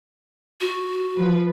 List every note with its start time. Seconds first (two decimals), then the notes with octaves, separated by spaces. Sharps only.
0.61 F#4
1.16 F3 B4